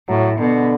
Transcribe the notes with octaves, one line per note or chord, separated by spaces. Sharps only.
A2 F#3
B2 D3